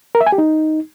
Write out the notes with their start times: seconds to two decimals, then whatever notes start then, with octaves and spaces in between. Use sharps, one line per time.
0.15 A#4
0.21 E5
0.27 G#5
0.32 G4
0.38 D#4